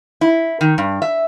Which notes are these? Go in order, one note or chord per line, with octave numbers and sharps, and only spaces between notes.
E4
D#3
G2
E5